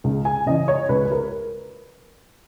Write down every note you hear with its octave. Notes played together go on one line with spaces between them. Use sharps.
C#2
G#5
C#3 E3 D#5
C#5
C#2 B4
B4
A#4